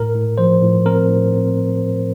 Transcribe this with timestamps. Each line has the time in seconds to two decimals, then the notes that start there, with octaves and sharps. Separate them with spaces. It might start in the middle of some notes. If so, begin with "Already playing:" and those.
Already playing: A2 A#4
0.15 A2
0.38 F3 C5
0.62 A2
0.86 C4 A#4
1.09 A2
1.32 C4